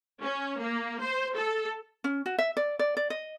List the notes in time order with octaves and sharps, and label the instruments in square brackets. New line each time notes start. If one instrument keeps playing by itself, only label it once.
[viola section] C#4
A#3
C5
A4
[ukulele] C#4
F#4
E5
D5
D5
D5
D#5